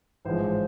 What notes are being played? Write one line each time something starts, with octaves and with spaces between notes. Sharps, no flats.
A1 G#2 F3 G#3 C5